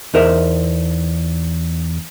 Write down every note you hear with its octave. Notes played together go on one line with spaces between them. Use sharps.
E2 D#4 A#4 C5 E5